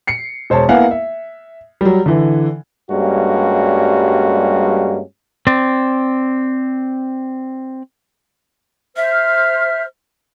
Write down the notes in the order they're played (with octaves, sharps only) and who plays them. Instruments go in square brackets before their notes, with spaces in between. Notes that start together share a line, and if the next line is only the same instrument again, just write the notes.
[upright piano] C7 C#7
E1 C5 C#5 A5
A#3 B3 E4 F5 F#5 G#5
E5
F#3 G3
D3 E3
[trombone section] G2 G3 G#3 A#3 C#4 F#4
[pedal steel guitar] C4 D5
[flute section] C5 F6 [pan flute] E5